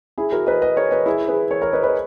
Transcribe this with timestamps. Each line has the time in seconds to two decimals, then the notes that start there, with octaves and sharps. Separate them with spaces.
0.18 E4 G#4
0.32 F#4 A#4
0.47 B4 D#5
0.62 B4 D#5
0.77 A#4 C#5
0.91 B4 D#5
1.06 E4 G#4
1.28 G#4 B4
1.51 A#4 C#5
1.62 A#4 C#5
1.73 B4 D#5
1.83 B4 D#5